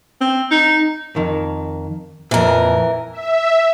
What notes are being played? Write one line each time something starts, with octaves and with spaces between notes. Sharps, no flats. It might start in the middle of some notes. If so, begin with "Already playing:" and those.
C4
D#4
F2 D#3
F2 A#2 E3 A#4
E5